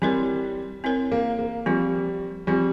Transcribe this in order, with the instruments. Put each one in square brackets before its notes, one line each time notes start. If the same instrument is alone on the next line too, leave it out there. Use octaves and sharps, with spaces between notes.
[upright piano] G3 [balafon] C4 E4 A#4 C#5
[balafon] C4 E4 A#4 C#5
[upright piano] A#3
A#3
[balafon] F3 C4 F4 [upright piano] G3
[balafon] F3 C4 F4 [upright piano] G3